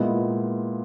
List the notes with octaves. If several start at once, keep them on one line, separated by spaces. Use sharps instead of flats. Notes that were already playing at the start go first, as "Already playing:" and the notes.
Already playing: A#2 G#3 B3 E4